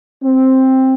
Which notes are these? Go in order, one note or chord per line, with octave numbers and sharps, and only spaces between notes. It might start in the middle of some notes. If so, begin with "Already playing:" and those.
C4